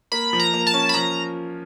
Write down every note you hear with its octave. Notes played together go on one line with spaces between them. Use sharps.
A#3 B5
F3
A#5
A#3
A5
C#4
B5
F3 A#5